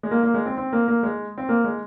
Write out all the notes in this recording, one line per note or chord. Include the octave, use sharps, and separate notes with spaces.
G#3
A#3
A#3
G#3
C4
C4
A#3
A#3
G#3
C4
A#3
G#3